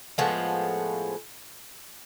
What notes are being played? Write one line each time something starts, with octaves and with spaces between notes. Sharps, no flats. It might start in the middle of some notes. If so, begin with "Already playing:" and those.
A2 F3 G#3 B3